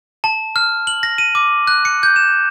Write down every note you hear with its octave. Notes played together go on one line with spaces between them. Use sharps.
A5
F6
F#7
A#6
D#7
D6
F#6
C#7
G6
E7